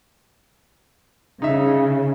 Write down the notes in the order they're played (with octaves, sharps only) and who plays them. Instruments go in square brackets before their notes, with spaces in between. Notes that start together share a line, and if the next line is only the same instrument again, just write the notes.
[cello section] C#3 [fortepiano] D#4 E5